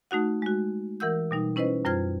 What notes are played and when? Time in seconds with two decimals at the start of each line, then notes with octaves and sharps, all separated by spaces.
0.11 A3 D#4 F#4 F#5
0.42 G#3 F#4
1.00 E3 A#4 F#5 E6 G6
1.31 B2 G3 D#4
1.56 C#4 E4 B4 C5 D#5
1.85 F#2 G3 F4 C5 F6 G#6